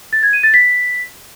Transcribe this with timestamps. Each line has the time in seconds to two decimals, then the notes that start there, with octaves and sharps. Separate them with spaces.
0.13 A6
0.23 G#6
0.33 D#7
0.43 A6
0.54 B6